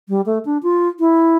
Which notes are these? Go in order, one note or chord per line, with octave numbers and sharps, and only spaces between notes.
G3
A3
D4
F4
E4